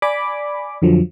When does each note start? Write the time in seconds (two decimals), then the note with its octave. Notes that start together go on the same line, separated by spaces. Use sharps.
0.02 D5 G#5 B5 D6
0.82 F2 D3 F3 F#3